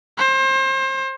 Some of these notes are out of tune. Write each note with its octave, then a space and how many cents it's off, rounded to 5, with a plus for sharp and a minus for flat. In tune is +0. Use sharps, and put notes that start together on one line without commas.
C5 +30